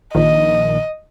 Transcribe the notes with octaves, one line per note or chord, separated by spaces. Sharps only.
A#1 D#3 D#5